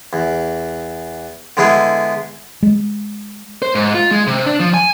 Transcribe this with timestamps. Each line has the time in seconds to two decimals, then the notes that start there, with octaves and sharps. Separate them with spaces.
0.13 E2
1.57 D3 G#3 B3 E4 G#4 A4
2.63 G#3
3.62 C5
3.75 G#2
3.95 F4
4.11 G#3
4.27 C3
4.46 D4
4.60 F3
4.74 G#5